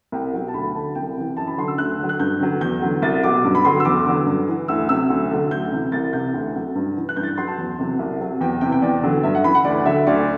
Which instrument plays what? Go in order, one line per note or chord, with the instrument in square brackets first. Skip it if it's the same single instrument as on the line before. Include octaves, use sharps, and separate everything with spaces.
[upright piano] C2 G5
B2 F#3
A5
D2 B5
D3 F#3 A5
C2 G5
C3 E3
F#2 A5
B5
D3 F#3 C6
E6
D2 F#6
D3 F#3
F#6
G2 G6
D3 F#3
E2 G6
D3 F#3
C2 A6
B2 F#3 D6
G2
B5
D3 F#3 C6
E6
E2 D6
D3 F#3
G2
E3
D2 E6
C3 F#3 E6
D2
D3 F#3
D2 G6
C3 E3
C2 A6
C3 E3 G6
D2
C3 F#3
G2
E3
F#6
G2 G6
A6
G6
F#3 C6
A5
E2
C3 F#3
C2
C3 F#3
E2 G5
C3 E3 G5
G5
E2 D5
D3 F#3
G2 E5
F#5
E3 B5
F#5
D2 D5
D3 F#3 E5
D2 D5